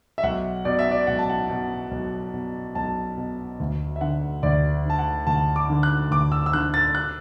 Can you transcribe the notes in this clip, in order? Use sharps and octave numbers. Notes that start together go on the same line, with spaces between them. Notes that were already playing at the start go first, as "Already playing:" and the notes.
E5
B1 F#5
B2 D5
E5
D5
B1 F#5
A5
F#5
B2
B1
B2
B1 A5
B2
D2
E5
D3 F#5
D2 D5
D3 A5
F#5
D2 A5
D6
D3
F#6
D2 D6
E6
E6
D3 F#6
A6
F#6